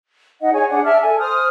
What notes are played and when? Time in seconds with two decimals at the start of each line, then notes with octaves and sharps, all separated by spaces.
0.41 D#4 D#5 F#5
0.53 G#4 C#5 G#5
0.69 D4 G#4 F#5
0.85 D5 E5 A5 F6
1.02 A4 G#5
1.19 C5 D#6 F6